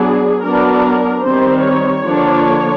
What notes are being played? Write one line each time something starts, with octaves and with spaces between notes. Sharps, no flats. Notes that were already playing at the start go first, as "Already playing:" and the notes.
Already playing: F#3 B3 D4 G#4
F#3 B3 D4 A#4
D#3 G3 C4 C5
C#5
D3 F3 A#3 D4